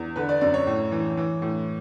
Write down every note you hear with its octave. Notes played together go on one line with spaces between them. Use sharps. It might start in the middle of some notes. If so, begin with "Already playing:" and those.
Already playing: E2
D3 B4
D5
F#2 D5
C#5
A2
E3
E3
A2